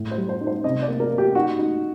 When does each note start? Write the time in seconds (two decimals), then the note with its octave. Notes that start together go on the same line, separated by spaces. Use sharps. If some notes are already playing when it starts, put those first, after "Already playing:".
Already playing: A2
0.11 C5
0.18 G3
0.29 C5
0.41 D#4
0.47 C5
0.64 C3 D#5
0.82 D5
0.88 A#3
1.00 A#4
1.12 A#3
1.18 G4
1.35 D#4 F#4
1.59 D#4